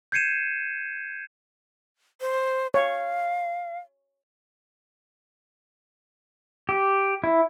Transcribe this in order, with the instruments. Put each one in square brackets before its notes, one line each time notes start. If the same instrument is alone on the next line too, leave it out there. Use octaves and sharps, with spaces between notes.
[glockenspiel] G6 G#6 C7 C#7 D#7 E7
[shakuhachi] C5
[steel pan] C#5 [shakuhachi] F5
[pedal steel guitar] G4
E4